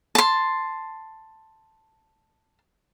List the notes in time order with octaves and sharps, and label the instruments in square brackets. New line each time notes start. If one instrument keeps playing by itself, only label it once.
[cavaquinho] A5 C6